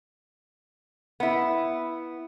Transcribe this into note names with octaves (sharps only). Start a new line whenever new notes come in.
B3 E4